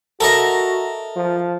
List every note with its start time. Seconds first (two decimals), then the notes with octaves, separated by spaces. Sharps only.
0.20 F#4 A4 A#4 D#5 E5 A#5
1.17 F3